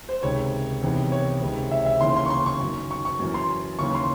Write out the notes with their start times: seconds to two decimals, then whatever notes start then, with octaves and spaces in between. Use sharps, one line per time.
0.09 C5
0.23 C#2 C3 D#3 C#5
0.83 E2 C3 D#3
1.12 C#5
1.42 C#2 C3 D#3
1.71 E5
1.86 E5
2.01 D#2 C#3 E3 C6
2.17 C6
2.26 C#6
2.30 C6
2.46 C#6
2.61 F#2 D#3
2.91 C#6
3.05 C#6
3.20 F#2 E3
3.34 C6
3.79 D#2 C#3 E3 C#6
3.95 C6